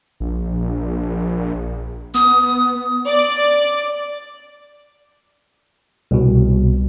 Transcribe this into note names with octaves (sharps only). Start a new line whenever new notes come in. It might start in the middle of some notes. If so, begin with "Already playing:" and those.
A#1
B3 D#6
D5
C2 B2